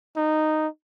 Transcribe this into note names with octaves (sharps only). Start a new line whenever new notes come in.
D#4